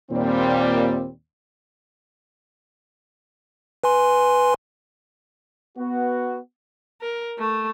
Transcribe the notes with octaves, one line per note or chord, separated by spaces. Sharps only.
D#2 A#2 G3 C4
B4 G#5 C6
B3 F#4
A#4
A3